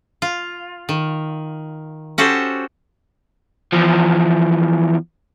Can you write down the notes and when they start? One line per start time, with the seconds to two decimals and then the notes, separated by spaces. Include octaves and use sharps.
0.22 F4
0.89 D#3
2.18 C#4 F#4 G4 A4 C5
3.73 E2 F3